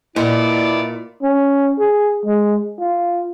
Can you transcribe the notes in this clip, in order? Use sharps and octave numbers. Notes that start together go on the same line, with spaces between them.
A#2 E4 B4 D5 D#5
C#4
G#4
G#3
F4